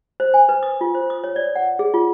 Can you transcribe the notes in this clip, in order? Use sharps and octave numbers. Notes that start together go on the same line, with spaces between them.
C5
G#5
B4
D#6
F4
C5
D#6
C#5
D5
F#5
G#4
F4